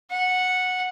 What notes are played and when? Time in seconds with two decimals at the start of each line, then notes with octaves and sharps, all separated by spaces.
0.10 F#5